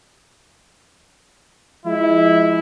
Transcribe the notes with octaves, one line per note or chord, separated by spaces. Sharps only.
F3 G#3 E4